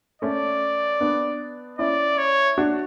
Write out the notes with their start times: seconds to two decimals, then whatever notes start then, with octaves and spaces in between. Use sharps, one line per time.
0.22 A3 C#4 D5
1.01 B3 D4
1.79 C#4 E4 D5
2.18 C#5
2.58 D4 F#4